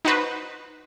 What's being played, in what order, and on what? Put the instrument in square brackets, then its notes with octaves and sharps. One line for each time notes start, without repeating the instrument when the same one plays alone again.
[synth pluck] D#4 F#4 B4 C5